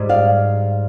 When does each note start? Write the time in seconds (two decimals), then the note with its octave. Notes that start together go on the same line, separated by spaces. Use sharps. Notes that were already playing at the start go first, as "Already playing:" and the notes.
Already playing: G#2 G3
0.09 D5 F5